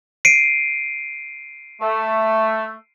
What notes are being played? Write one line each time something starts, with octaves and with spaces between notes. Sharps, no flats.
C7 D7 D#7
A3